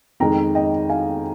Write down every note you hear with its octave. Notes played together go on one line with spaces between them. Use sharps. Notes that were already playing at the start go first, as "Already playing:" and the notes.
F2 D#3 G#3 G5 A#5
D#5 G5
F5 G#5